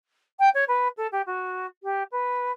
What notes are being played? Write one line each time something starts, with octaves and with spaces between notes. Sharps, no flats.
G5
C#5
B4
A4
G4
F#4
G4
B4